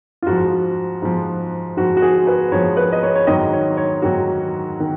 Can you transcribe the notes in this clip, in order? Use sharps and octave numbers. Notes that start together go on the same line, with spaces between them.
F4
G#2 F3 F#4
G#2 F3
G#2 F3 F#4
F#4
G#4
B4
G#2 F3 C#5
B4
D#5
C#5
C#5
G#2 D#3 F#3 D#5
C#5
C#5
G#2 D#3 F#3 F#4
D#3